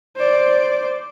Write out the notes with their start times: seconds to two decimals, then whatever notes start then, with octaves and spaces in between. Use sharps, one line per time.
0.16 C5 D5